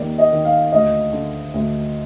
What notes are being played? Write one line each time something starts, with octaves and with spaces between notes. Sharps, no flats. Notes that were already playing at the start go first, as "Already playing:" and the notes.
Already playing: D#2 D#3 D5
D#5
D#3
F5
D2 D#5
D3
D2